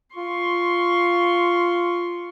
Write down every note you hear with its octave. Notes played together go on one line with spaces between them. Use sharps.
F4 C6 C#6